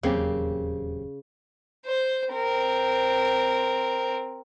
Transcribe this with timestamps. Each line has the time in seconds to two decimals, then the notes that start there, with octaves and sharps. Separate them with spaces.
0.03 D#1 E2 C#3 F#3 A#3 C4 G4
1.86 C5
2.34 C4 A#4